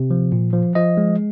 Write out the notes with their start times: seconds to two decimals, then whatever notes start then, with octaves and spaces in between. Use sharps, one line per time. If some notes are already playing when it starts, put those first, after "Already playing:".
Already playing: C3
0.11 F3
0.32 A#2
0.53 F3
0.75 F3 D#5
0.97 G#3